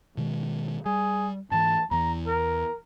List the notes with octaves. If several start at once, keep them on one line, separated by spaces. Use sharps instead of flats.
B2 D#3 G#3
G3 G#4
G#2 E3 A5
E2 E3 A#5
A#4